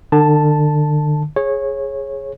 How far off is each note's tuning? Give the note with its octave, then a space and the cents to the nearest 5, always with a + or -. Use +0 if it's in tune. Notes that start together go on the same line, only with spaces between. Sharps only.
D3 +35 A5 +0
G#4 +0 C#5 -20